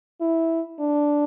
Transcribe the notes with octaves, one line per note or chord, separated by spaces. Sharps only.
E4
D4